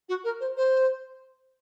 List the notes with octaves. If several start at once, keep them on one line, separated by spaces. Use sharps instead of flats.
F#4
A#4
C5
C5